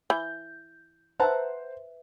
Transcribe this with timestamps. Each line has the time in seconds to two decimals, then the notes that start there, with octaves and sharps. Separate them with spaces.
0.10 E3 G6
1.20 B4 C5 E5 F#5 A5 A#5